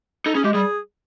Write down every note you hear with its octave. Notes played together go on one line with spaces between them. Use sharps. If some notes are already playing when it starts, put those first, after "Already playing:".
D#4 A4
C#4 G#4
G#3 G4
G3 G#4